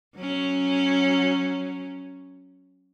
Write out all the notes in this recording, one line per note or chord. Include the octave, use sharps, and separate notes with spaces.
F#3 C#4